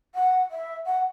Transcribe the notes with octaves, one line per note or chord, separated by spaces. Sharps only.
F#5
E5
F#5